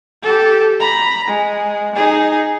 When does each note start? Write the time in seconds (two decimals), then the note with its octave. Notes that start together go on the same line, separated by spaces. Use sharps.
0.23 G4 A4
0.80 A#5 B5
1.28 G#3
1.95 D#4 G#4